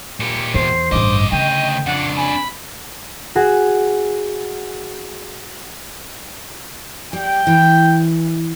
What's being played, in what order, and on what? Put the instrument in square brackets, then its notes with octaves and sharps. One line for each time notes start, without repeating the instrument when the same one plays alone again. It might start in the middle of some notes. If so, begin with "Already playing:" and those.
[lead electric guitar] A#2 G4 [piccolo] C#7
[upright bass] E2 [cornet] C5 [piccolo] C7
[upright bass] A1 G2 [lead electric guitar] D2 D#5 [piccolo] D6
[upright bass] C#3 [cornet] G5 [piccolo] D#7
[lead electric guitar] F2 D4 [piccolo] F#5
[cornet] G#5 [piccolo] B5
[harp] F#4 G#4
[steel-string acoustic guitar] G3 [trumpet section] G5
[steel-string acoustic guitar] E3